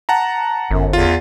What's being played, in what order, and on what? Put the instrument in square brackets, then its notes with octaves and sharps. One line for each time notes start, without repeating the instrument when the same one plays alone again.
[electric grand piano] F#5 A5 A#5
[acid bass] G1 [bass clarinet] F#2
[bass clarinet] E2 [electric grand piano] F4